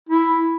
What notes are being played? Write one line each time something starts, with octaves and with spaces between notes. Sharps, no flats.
E4